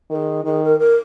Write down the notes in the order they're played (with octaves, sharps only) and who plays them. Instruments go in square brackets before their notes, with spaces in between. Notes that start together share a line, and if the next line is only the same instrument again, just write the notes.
[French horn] D#3 [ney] A#4
[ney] G#4
[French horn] D#3 [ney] G#4
[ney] A#4
A#4